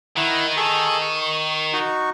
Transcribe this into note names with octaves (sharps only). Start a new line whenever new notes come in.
D#3 E4 F#5
G#4 A4 C#6
C#6
D#4 F#4 C#6